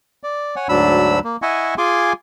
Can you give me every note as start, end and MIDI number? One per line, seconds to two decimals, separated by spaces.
0.23 0.55 74
0.56 0.68 73
0.56 0.68 78
0.56 0.68 80
0.69 1.19 38
0.69 1.19 44
0.69 1.19 54
0.69 1.19 62
0.69 1.19 83
0.69 1.19 88
1.24 1.37 58
1.42 1.75 64
1.42 1.75 75
1.42 1.75 76
1.42 1.75 78
1.42 1.75 80
1.42 1.75 85
1.78 2.13 65
1.78 2.13 68
1.78 2.13 80
1.78 2.13 84
1.78 2.13 86